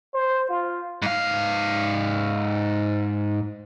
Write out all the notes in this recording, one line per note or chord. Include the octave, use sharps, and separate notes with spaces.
C5
F4
G#2 F5